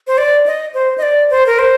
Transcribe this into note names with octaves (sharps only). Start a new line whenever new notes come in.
C5
D5
D#5
C5
D#5
D5
C5
A#4
C5